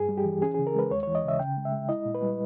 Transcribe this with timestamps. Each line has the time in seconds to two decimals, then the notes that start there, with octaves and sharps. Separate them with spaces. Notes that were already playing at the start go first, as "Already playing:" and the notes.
Already playing: G2 G#4
0.09 G3
0.18 G4
0.25 E3
0.42 C#4 G#4
0.54 C#3 G#4
0.67 A#4
0.75 G#3 B4
0.91 D#2 C#5
1.03 E3 C#5
1.15 D#5
1.24 C#3 E5
1.39 C#3 G5
1.57 G#3
1.65 E5
1.72 G#3
1.89 E4 D#5
2.05 A#2
2.14 B4
2.22 G3